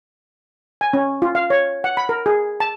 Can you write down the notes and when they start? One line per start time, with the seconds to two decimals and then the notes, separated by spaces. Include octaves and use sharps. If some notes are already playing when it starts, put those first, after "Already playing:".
0.81 G#5
0.93 C#4
1.22 F4
1.35 F5
1.50 C#5
1.84 F#5
1.97 B5
2.09 A#4
2.26 G#4
2.60 A5